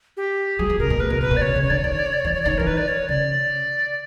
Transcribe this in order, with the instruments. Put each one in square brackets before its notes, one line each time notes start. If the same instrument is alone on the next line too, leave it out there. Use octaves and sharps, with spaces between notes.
[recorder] G4
[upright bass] F#3 [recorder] G#4
[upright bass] F3
[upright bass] C#3 [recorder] A#4
[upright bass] B2
[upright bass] A#2 [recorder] B4
[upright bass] B2 [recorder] A#4
[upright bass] B2 [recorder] B4
[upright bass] B2
[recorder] D5
[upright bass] C#3 [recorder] C#5
[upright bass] C#3
[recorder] C#5
[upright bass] D3 [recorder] D5
[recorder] C#5
[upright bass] D#3 [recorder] D5
[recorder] C#5
D5
C#5
D5
C#5
[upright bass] E3
[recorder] D5
C#5
D5
[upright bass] D#3
[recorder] C#5
[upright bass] E3 [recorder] A#4
[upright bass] D#3 [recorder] B4
[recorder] D5
C#5
[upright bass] C#3 [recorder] D5